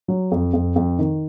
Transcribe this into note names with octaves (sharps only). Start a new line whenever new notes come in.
F#3
F2
F2
F2
D#3